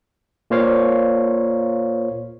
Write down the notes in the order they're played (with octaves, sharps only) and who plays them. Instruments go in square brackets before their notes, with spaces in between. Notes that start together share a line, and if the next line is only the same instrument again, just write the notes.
[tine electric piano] A#2 A#3 C5 C#5 F5